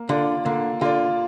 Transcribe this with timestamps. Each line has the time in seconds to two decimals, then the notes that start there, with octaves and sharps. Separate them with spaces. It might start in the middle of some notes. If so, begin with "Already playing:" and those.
Already playing: A#3
0.09 D3 F4 D5
0.45 D3 A#3
0.81 D3 F4 D5